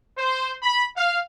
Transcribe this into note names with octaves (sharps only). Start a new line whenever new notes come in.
C5
B5
F5